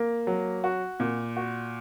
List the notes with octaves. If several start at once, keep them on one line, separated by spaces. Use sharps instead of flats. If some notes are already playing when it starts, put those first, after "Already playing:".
Already playing: A#3
F#3
F#4
A#2
F#4